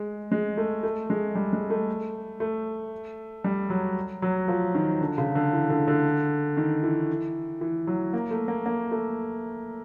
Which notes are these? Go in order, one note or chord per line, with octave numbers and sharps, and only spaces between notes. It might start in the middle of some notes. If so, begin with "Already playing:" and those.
Already playing: G#3
G#3
A3
A3
G#3
G3
G#3
A3
A3
G3
F#3
F#3
F3
D#3
D3
C#3
D3
E3
D3
D3
D#3
E3
E3
F#3
A#3
A3
A#3
A#3
A3